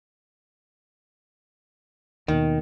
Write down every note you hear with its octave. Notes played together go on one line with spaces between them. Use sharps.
D#2 B2 D#3